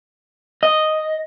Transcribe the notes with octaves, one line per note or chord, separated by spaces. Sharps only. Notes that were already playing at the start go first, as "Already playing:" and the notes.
D#5